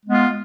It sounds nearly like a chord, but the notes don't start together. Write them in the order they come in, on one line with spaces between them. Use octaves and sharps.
G#3 B3 F4